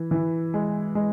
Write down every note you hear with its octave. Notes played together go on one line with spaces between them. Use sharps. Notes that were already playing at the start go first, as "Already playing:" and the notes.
Already playing: E3
E3
G#3
G#3